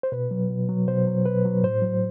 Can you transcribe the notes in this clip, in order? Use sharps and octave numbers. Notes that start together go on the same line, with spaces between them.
C5
B2 B4
F#3
B2
F#3
B2 C5
F#3
B2 B4
F#3
A2 C5
F#3